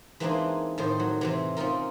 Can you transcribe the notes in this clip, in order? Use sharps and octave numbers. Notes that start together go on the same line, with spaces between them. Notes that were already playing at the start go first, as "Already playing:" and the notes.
E3 G#3 A#3 C4 D4 D#4
A2 D#3 C5
F#3
C3 E3 C4
C4 C#4 D#4 F4 A#4